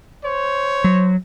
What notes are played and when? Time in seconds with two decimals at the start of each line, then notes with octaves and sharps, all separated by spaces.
0.23 C5 C#5
0.84 F#3